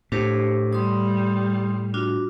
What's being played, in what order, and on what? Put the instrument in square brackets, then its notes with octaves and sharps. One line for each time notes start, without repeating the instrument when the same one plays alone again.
[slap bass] A2 [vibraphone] D4 G4 C5
[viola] G3 [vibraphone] C6 D#6
[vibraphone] D4 F4 F#4